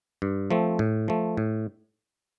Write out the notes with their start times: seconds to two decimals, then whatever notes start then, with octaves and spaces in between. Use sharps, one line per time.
0.22 G2
0.51 F3 A3 C4
0.79 A2
1.08 F3 A3
1.37 A2